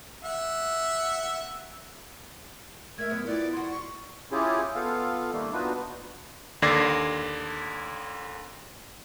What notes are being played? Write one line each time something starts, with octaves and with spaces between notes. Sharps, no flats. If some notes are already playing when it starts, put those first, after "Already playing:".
E5 F#5
A3 A#4 E5 G#6
F#2 B3
B3 E4 F4 G4 D5
F2 F#4 C6
C#6
C#4 E4 F4 G4 G#4
B3 F4 A4 F5
A#2 D#3 G3 A3 A#3
B3 D4 D#4 F4 F#4 B4
D#2 D3 D5 G#6 A#6 C7